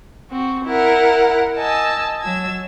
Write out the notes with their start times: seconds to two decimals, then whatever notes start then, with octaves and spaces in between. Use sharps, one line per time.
0.30 C4 F#4
0.66 E4 A#4 F#5
1.59 D#5 G#5 A5 E6
2.20 F#3 E6 G#6